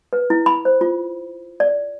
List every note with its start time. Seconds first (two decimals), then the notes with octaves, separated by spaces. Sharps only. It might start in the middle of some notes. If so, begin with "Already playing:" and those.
0.13 B4
0.30 E4
0.46 B5
0.65 C5
0.81 F4
1.60 D5